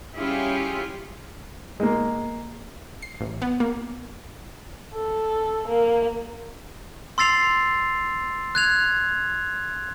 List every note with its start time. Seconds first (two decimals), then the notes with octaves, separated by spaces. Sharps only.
0.16 G3 C#4 E4 F4 G4 G#4
1.80 G#3 A#3
3.02 C7
3.20 A1
3.42 B3
3.60 A#3
4.94 A4
5.69 A#3
7.18 C6 E6 A6 C7 F7
8.55 F#6 G#6 F7